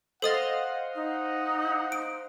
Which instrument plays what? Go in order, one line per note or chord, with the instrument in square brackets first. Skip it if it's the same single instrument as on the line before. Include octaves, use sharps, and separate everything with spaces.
[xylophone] A4 D#6 A6 [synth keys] C5 D#5 F5 [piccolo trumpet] F#5
[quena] D#4 [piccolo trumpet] F#5
[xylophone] D7